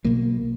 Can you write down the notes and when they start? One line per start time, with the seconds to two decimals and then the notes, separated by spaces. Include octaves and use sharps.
0.04 B1 B2 A#3